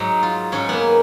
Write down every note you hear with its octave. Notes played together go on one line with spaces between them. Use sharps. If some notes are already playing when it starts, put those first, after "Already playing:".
Already playing: G#2 F#3 D#4
F4
G#2 F#3 C#4
A#3 B3